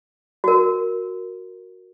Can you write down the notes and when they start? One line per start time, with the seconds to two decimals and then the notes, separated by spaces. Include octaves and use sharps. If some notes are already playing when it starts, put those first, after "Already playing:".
0.44 F#4 A#4